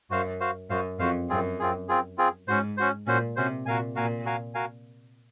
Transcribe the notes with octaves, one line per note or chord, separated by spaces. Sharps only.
F#2 F#4 C5 F5
F#4 C5 F5
F#2 F#4 C5 F5
F2 F#4 C5 F5
F#2 C4 F4 G#4
C4 F4 G#4
C4 F4 G#4
C4 F4 G#4
G#2 C#4 F#4 C5
C#4 F#4 C5
A#2 C#4 F#4 C5
C3 C#4 F#4 C5
A#2 F#4 A#4 F5 G#5
A#2 F#4 A#4 F5 G#5
F#4 A#4 F5 G#5
F#4 A#4 F5 G#5